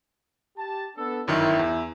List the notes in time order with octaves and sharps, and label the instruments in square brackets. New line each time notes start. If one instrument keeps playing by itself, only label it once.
[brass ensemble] G4 A5
B3 D4 A4
[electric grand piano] G1 F#2 D#3 [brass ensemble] E4
[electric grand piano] E2